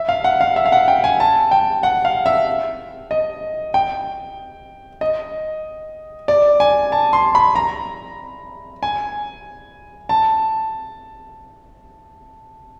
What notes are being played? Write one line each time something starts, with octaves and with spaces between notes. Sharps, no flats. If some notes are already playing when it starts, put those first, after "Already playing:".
Already playing: E5
F5
F#5
F5
E5
F5
F#5
G5
G#5
A5
G5
F#5
F5
E5
D#5
G5
D#5
D5
G#5
A5
C6
B5
A#5
G#5
A5